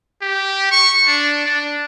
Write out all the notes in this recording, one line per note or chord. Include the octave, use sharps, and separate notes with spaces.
G4
C#6
D4
D4